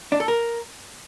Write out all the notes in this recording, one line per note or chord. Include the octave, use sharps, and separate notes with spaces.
D4
A4
A#4